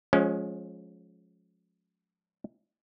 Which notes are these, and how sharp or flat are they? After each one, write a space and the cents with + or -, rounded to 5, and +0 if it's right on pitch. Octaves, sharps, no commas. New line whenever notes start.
F3 +25 G#3 +20 C#4 +0